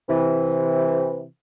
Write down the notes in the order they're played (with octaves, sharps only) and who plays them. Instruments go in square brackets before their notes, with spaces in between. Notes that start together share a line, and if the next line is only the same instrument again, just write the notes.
[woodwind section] C3 E3